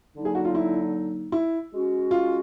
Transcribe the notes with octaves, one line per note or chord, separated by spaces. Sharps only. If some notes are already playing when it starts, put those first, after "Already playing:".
D3 F#3 A#3 D#4
G#4
F#4
F4
E4
E4
G#3 C#4 F#4
F4